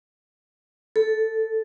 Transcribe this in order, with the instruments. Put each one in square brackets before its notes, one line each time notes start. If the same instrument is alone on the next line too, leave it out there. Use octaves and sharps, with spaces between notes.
[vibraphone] A4